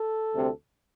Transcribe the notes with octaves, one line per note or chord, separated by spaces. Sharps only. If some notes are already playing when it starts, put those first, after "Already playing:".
Already playing: A4
D2 C3 G3 C4